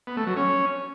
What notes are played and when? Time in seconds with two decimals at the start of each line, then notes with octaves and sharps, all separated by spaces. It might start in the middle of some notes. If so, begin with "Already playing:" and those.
0.07 B3
0.17 A3
0.27 F#3
0.36 C#4